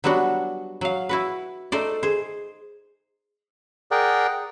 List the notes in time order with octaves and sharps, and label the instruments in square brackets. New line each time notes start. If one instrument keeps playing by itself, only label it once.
[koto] F#3 G3 B3 D4 F#4
F#3 F5
E4 F#4 B4
A3 D#4 C5 D5
G#4 C5
[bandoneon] G#4 A#4 D5 F#5 G5